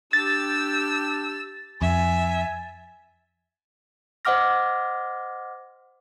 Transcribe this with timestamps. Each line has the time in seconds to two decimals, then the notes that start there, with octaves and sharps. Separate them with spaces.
0.13 D4 G4 E6 A6
1.82 F2 E5 G#5
4.25 C5 D#5 F#5 D6 F6 A#6